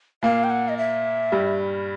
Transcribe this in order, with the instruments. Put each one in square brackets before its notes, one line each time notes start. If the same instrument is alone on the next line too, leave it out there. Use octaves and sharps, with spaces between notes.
[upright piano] A#2 A#3 [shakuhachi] F5
[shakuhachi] G5
F#5
D#5
E5
[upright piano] G2 G3